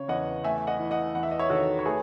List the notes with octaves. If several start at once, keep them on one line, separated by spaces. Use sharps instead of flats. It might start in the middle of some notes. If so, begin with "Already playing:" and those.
Already playing: C#3 C#5
E2 D#5 F#5
A3 E5 G#5
D#5 F#5
E3
D#5 F#5
E2 F#5
E5
D#5
C#5 E5
D#3 F#4 A4
C#5
A3 G#4 B4